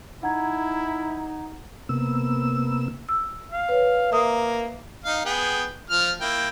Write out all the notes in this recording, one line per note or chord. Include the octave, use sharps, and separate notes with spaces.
D#4 E4 F#5 A#5 G#6
C3 A#3 B3 E6
E6
F5
B4 C#5
A#3 E5 D#6
D#4 F5
B3 G#4 G5
F3 F6
A#3 E4 G5